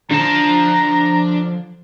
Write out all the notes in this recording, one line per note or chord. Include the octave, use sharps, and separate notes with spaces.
D3 F3 D4 A5 A#5